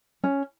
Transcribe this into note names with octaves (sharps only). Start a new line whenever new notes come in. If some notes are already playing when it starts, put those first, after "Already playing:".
C#4